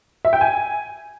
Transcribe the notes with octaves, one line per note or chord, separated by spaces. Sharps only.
E5
G5
G#5